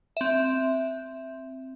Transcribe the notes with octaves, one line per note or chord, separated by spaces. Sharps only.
C4 E5